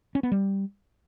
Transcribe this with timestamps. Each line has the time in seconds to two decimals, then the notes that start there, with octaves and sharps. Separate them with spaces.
0.15 C#4
0.23 B3
0.32 G3